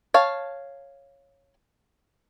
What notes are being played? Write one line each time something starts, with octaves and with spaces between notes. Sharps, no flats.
C#5 F5 A5